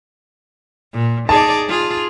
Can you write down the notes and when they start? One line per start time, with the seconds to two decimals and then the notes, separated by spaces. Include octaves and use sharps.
0.93 A#2
1.29 D#4 G#4 D5 A5
1.68 F4 G#4